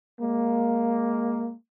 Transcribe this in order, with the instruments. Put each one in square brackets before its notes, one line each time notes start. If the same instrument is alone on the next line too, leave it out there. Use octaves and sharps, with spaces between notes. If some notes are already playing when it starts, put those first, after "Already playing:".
[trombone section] G#3 A#3